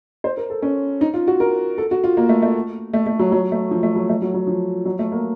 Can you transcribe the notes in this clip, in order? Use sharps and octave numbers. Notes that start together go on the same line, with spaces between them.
C5
A#4
A4
C#4
D#4
F4
F#4
A#4
A4
F#4
F4
A#3
A3
A3
A3
A3
F#3
F#3
A3
F3
A3
F#3
A3
F#3
F#3
F3
F#3
A3
A#3